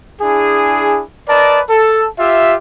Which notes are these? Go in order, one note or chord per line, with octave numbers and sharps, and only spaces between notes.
D4 E4 G#4
A#4 B4 D5 D#5 A5
A4
F4 G4 E5